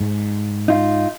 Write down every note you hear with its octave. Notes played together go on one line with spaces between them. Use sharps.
G#2
D#4 F4